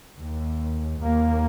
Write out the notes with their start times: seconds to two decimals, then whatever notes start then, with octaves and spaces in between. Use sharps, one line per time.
0.20 D#2
1.03 D#2 A#3